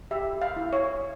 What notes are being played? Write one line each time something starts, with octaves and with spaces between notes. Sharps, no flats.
G4 E5
F5
E4
C#5